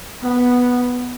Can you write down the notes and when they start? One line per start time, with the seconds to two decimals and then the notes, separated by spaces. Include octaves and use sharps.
0.22 B3